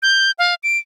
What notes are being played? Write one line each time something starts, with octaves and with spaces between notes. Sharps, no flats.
G6
F5
D7